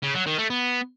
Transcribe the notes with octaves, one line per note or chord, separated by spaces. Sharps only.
C#3
F#3
D#3
A3
B3